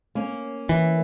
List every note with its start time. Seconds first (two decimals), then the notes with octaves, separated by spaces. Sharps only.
0.15 A#3 C#4
0.69 E3